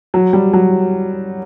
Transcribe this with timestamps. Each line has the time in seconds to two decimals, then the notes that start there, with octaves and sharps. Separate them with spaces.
0.14 F#3
0.33 G3
0.53 F#3